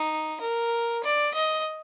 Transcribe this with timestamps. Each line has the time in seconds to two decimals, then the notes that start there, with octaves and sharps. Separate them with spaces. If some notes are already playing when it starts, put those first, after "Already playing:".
Already playing: D#4
0.41 A#4
1.04 D5
1.34 D#5